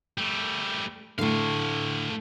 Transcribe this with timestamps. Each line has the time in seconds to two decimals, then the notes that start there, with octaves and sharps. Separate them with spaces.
0.18 G3 A3
1.19 A2 D3 A3 F5